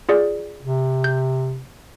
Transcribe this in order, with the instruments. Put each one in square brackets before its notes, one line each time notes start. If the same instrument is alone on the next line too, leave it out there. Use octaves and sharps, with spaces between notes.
[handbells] F4 G#4 D5
[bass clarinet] C3
[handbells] G6